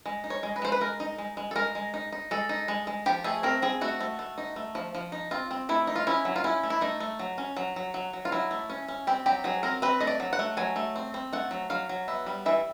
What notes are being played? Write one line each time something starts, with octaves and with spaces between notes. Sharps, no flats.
G#3
D#4
C#5
G#3
B4
G#3 C5
B4
G#3 A#4
D#4
G#3
G#3
A4
G#3 A#4
G#3
D#4
D#4
G#3 A4
D#4
G#3
G#3
F3 G4
A3 G#4
C4 A#4
C4 G#4
A3 F#4
A3
A3
D#4
A3
F3
F3
D#4
C4 F4
C4
A3 E4
D#4
F4
C#4 E4
F#3
F4
C#4 E4
A3
E4
A3 D#4
A3
F#3
C#4
F#3
F#3
F#3
F#3
F4
F#3 E4
A3
C#4
C#4
C4 G4
F#3 G4
F#3 G#4
C4 A#4
C4 B4
A3 D#5
D5
F#3
F#5
A3
F#3 G#5
A3
C4
C4
A3 F#5
F#3
F#3 F5
F#3
B3 E5
G3
E3 E5